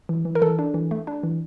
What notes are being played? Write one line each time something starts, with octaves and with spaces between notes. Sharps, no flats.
E3
E3
A#4
E3 A4
D4
E3
A3
D4
E3